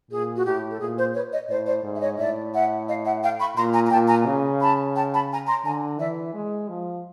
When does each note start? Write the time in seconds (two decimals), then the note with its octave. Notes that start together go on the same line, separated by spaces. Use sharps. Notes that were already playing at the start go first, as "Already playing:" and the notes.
0.10 A#2 G#4
0.35 F#4
0.45 A2 G4
0.70 A4
0.80 A#2 G#4
0.97 C5
1.14 B4 C#5
1.32 C#5 D#5
1.48 A2 C5 D5
1.66 C5 D5
1.84 G#2
1.95 E5
2.01 C#5 D#5
2.18 A2 D5 E5
2.53 E5 F#5
2.88 D#5 F5
3.04 E5 F#5
3.22 F5 G5
3.39 B5 C#6
3.56 A#2 A#5 C6
3.74 G#5 A#5
3.86 A#5
3.91 A#2 G5 A5
4.08 G#5 A#5
4.26 C#3
4.61 A5 B5
4.95 G5 A5
5.13 A5 B5
5.31 G#5 A#5
5.48 A#5 C6
5.65 D3 G#5 A#5
5.99 E3 D5 E5
6.34 G#3
6.69 F3